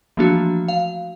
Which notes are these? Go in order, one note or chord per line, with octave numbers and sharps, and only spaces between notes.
E3 F3 A3 A#3 D4 F#4
F5